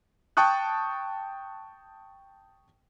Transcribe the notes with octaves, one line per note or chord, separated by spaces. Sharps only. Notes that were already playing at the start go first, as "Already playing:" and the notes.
G5 A5 C#6 D#6 F#6